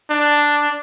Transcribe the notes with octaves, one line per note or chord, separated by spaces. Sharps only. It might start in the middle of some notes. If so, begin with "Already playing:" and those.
D4